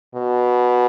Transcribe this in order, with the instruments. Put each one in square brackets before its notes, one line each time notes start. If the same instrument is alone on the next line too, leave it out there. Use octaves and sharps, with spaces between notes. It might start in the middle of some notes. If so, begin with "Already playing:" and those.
[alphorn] B2